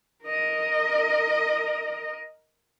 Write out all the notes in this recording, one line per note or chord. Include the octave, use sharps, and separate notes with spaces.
A#4 D#5